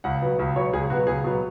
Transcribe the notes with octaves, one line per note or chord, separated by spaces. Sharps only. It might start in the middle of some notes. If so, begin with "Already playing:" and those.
C#2 F#5
B2 F#3 B3
C#2
B2 F#3 B3 C#5
C#2 G#4
B2 F#3 B3 F#4
C#2 G#4
B2 F#3 B3